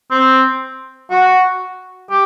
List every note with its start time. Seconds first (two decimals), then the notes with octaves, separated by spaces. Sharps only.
0.11 C4
1.11 F#4
2.10 G4